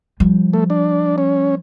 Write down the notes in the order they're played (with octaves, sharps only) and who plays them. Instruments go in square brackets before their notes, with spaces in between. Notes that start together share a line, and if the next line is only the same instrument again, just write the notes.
[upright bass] F3 G3
[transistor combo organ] A3
D4
C#4